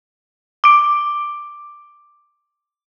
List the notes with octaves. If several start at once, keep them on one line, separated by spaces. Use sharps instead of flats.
D6 D7